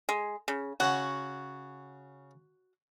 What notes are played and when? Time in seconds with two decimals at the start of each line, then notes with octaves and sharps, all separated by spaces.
0.09 G#3
0.48 C#3
0.80 C#3 C#4 F#4 F#5